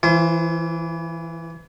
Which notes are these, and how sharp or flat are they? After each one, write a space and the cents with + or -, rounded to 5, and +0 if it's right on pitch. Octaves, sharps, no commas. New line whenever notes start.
E3 +0 F4 -45 C5 +5